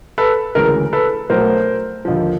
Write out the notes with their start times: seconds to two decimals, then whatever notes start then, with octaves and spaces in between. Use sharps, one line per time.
0.18 A4 B4
0.55 D2 C#3 E3 G#3 A#4
0.93 A4 B4
1.30 B1 B2 F#3 A3 A#4 C5
2.05 D#2 D3 F3